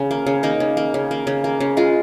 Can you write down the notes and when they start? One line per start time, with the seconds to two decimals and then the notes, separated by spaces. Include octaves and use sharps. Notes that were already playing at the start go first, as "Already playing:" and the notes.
Already playing: C#3
0.11 A#3
0.27 C#3
0.43 A#3 D#4
0.60 C#3
0.77 A#3
0.94 C#3
1.11 A#3
1.27 C#3
1.44 A#3
1.60 C#3
1.77 G#3 F4